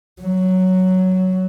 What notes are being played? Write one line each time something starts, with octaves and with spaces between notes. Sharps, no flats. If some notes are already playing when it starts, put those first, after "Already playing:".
F#3